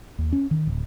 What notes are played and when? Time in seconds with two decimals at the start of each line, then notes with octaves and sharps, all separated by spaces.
0.18 D#2
0.33 C#4
0.51 D#3
0.67 D1